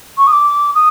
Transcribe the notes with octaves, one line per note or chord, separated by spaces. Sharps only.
C#6
D#6
D6
D#6